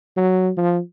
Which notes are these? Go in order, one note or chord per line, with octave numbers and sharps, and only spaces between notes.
F#3
F3